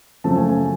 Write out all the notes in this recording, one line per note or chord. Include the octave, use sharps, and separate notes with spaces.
F#2 C#3 F3 A3 A5
G#5
G#5